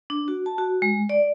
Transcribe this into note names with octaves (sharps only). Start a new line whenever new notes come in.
D4
F#4
A5
F#4
G#3
D5